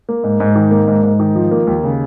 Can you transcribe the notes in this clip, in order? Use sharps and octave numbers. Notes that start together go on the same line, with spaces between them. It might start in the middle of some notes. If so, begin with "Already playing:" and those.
A#3
G#2
G#2
D#3
A#3
G#2
G#2
D#3
F3
A#3
D#2
C#3